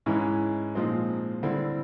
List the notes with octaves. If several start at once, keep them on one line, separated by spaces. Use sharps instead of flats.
G#2 E3 G#3 C#4 E4
A#2 F3 G#3 C4 D#4
D3 G3 C4 E4